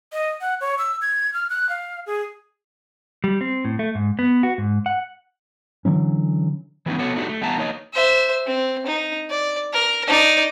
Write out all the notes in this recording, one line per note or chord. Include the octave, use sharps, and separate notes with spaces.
D#5
F#5
C#5
E6
G#6
F6
F#6
F5
G#4
G3
C4
A2
A3
G#2
B3
F#4
G#2
F#5
D3 E3 F#3 C#4
E3 F#3 B3 C#4 D#4
B3 F#4 A4 C#5
A3 D4 D#4 F#4 G4
A3
E3 G3 B3 E5 A5 A#5
A#3 D#4 C#5 D#5
C5 E5
C4
D#4
D5
A#4
D#4 D5